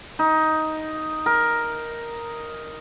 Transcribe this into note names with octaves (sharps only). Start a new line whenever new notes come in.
D#4
A#4